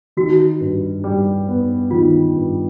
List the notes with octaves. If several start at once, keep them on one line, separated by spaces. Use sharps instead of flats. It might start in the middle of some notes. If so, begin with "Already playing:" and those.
D#3 F#4
G2
G3
B3
D#3 F4
G2